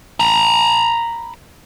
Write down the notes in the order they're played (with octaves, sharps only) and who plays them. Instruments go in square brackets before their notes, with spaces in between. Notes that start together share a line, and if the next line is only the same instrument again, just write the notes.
[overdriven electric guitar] A#5 B5